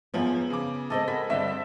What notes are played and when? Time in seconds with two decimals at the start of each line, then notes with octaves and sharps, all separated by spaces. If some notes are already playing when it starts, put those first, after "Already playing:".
0.14 F#2 F3 B3 C#4 G#4
0.50 C#3 D6
0.90 G#3 A3 C4 A4 D#5
1.08 F#4 G#4 A#4 B5
1.30 D2 G2 D3 C4 D5 E5